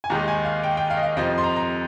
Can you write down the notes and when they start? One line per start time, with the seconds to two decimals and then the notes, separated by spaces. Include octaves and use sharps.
0.04 G#5
0.10 D#2 D#3 G#3 A#5
0.28 G#5
0.45 F5
0.64 G5
0.77 G5
0.90 F5
0.97 D#5
1.03 F5
1.17 F2 C3 F3 D#5
1.38 C6
1.44 A#5
1.57 A#5